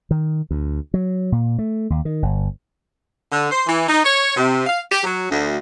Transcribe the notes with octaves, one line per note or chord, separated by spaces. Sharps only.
D#3
D2
F#3
A#2
A3
D#2
D#3
G1
D3
C5
E3
D#4
C#5
C3
F5
G4
F#3
D2